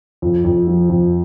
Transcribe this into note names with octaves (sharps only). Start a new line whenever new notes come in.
F2
F2
F3
F2